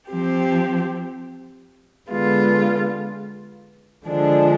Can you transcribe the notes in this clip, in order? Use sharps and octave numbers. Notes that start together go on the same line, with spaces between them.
F3 C4 G4
D3 G#3 B3 F4
D3 F3 G#3 D4